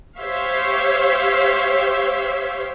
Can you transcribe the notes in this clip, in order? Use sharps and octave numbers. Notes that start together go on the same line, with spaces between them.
G4 C5 C#5 E5 F5